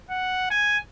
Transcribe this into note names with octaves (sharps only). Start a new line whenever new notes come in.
F#5
G#5